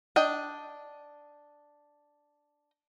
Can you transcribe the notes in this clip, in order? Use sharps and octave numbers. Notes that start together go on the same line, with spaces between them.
D4 D#5 G5